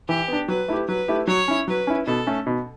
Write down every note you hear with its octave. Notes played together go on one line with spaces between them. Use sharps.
E3 G4
B3 D4
F#3 B4
A3 E4 G4
F#3 B4
A3 E4 G4
F#3 C#5
C#4 E4
F#3 B4
C#4 E4
B2 A4
A3 C#4
B2